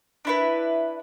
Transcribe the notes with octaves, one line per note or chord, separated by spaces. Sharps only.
D4 E4 B4